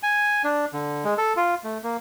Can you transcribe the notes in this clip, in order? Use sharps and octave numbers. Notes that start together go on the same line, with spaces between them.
G#5
D4
D3
G#3
A4
F4
A3
A#3